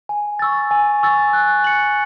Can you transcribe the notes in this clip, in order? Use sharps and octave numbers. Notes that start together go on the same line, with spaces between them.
G#5
C#6 E6 A6
G#5
C#6 E6 A6
F#6
C#7 F#7